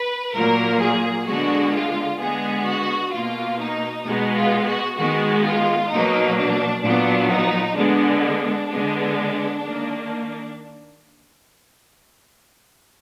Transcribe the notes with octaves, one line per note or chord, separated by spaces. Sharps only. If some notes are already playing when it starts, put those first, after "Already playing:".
Already playing: B4
A#2 F#3 A#3 A#4
G#4
D3 G#3 B3 F#4
F4
D3 G#3 B3 G#4
F#4
B2 A#3 F4
D#4
B2 G#3 B3 D#4
F4
F#4
D#3 G#3 B3 F#4
F4
B2 F#3 A#3 D#4
D4
A#2 F#3 B3 D4
D#4
D3 G#3 B3 D4
D3 G#3 B3
D#3 A#3